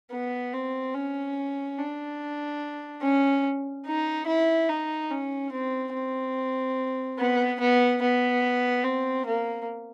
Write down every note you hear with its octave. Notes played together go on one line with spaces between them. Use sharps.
B3
C4
C#4
D4
C#4
D#4
E4
D#4
C#4
C4
C4
B3
B3
B3
C4
A#3